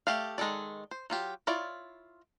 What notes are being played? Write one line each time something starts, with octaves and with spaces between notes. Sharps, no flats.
A3 G4 D5 F5
D#3 G#3 D#4 A4 D5
C5
F#3 F4 G4
E4 F4 C#5 D5